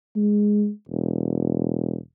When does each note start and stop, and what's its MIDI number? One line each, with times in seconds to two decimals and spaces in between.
0.16 0.70 56
0.89 1.98 28